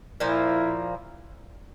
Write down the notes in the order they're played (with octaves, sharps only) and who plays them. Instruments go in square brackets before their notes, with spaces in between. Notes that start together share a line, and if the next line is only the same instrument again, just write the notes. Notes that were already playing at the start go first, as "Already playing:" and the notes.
[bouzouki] A#2 F3 A#3 [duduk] E4